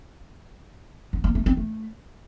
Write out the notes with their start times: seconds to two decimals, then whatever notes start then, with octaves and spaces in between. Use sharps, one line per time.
1.13 B3
1.24 A#3
1.35 A3
1.46 C4
1.57 A3